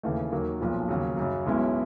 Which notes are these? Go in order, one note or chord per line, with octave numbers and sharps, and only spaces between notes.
D#2 C#3 E3 A3
D#2 D#3 F#3 A#3
B1 A#2 F3
D#2 C#3 F#3
F#2 C#3 F#3
B1 B2 G#3 C#4 E4